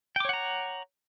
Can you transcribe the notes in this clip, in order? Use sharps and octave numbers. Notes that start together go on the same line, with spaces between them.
C#5 F#5 G5 A#5 D6